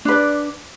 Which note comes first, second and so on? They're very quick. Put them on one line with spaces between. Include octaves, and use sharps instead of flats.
D4 B4 D5